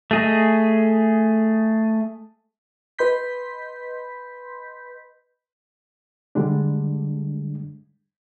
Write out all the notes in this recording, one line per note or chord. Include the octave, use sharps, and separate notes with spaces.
A3 G#4 D#5
B4 D#5 B5 C6 G6 B6
D3 G3 G#3 D4